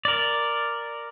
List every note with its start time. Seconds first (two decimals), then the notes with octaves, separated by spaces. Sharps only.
0.05 A#4 D5